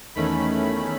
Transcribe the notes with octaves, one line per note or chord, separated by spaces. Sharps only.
E2 D#3 A3 C#4 B5